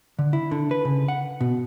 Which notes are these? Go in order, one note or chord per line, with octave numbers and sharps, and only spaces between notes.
D3
E4
D3
B4
C#3
F#5
B2